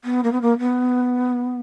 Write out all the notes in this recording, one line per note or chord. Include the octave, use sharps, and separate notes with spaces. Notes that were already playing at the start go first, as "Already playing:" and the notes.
B3
A#3
B3
A#3
B3